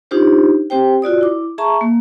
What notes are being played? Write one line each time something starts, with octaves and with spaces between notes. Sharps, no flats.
D4 D#4 F4 G4 C5
C4 G4 C5 G5
F4 F#4 D5 D#6
E4 D6
G#4 E5 A5 A#5 C#6
A#3